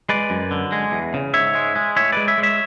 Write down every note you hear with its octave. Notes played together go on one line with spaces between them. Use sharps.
G#3 B4 D5
F#2
D3
G#3
E2
C#3
G#2 C#5 E5
G#3
G#3
A2 C#5 E5
G#3 B4 D5
C#5 E5
G#3
C#5 E5